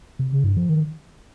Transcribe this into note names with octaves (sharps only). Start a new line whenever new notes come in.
C3
C#3
G2
F3
D#3